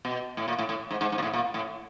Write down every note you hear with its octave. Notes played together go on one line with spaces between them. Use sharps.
B2
A2
A#2
A2
A2
G#2
G#2
G#2
A#2
A2
A#2
A2